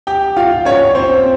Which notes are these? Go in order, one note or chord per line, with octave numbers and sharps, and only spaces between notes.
G4 G5
F4 F5
C#4 C#5
C4 C5